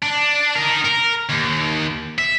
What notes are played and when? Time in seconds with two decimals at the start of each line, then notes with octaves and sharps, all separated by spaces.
0.03 D4
0.56 D#4 A#4
0.84 A#4
1.29 D#2
2.19 E5